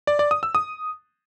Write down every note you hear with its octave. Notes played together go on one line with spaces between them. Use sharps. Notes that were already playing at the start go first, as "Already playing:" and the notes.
D5
D5
D#6
E6
D#6